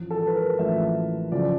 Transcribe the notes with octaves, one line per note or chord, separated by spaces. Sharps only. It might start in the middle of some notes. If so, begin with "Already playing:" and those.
Already playing: A1 A2 F3
A4
B4
A#4
A1 A2 F3 E5
F#2 C#3 F3 D5